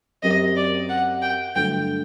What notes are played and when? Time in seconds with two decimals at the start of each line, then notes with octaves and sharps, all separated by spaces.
0.23 F#2 F#3 C4 G4 A#4 D#5
0.56 D5
0.89 F#5
1.22 G5
1.55 G2 D3 F#3 A3 G5